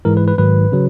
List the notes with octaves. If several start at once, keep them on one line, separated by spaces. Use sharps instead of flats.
G#2 E3 G#3 A#4
B4
B4
G#2 D#3 F#3 B4
C#3 F#3